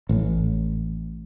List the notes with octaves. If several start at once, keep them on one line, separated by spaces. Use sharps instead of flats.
A1